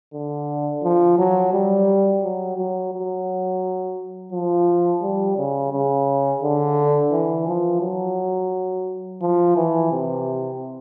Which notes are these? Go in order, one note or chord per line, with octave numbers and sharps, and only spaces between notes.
D3
F3
F#3
G3
F#3
F#3
F#3
F3
G3
C#3
C#3
D3
E3
F3
F#3
F3
E3
C3